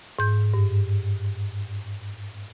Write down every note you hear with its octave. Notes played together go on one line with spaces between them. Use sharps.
G#2 G6
G2